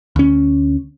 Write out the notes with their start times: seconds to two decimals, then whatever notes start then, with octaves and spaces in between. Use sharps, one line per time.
0.16 D2 C#4